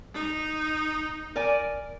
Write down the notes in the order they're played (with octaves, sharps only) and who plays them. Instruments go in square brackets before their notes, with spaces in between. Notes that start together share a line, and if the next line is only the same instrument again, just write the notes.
[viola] D#4
[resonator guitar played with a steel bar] A#4 D5 G#5